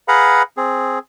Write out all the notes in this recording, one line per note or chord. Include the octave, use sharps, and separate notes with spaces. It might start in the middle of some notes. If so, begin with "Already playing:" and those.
G#4 B4 F5 F#5 A#5 B5
C4 G#4